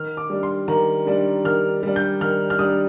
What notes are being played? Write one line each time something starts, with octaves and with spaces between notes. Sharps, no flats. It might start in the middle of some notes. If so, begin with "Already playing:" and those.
Already playing: D#3 F6
D6
G3 D4
C6
D#3 A#5
G3 D4
D#3 F6
G3 D4
G6
D#3 F6
F6
G3 D4 D#6